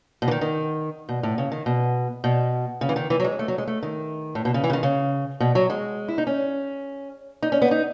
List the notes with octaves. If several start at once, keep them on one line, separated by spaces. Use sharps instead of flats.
B2
E3
D#3
D#3
B2
A2
C#3
D#3
B2
B2
C#3
E3
D#3
E3
F#3
G#3
A3
F#3
G#3
A3
D#3
A2
B2
C#3
E3
C#3
D#3
C#3
B2
F#3
G#3
E4
D#4
C#4
D#4
C#4
B3
D#4